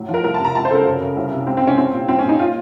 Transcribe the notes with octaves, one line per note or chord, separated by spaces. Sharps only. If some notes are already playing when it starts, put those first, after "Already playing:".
Already playing: A2 F#3
F3
A#4
C2 A#4
A5
C3
A#5
C#2 A5
C5
C#3 A4 A#4
F#2
C#3
C2
C3
C#2 C4
C4
C3
C#4
C2 C4
A#2
C2 C4
C#4
A#2
D#4
F4